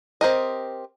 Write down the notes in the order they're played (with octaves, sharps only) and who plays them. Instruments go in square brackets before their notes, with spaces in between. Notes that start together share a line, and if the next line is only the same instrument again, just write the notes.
[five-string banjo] C4 G4 A#4 D#5